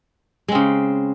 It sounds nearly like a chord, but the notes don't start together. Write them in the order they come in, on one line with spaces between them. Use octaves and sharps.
G#3 C4 C#3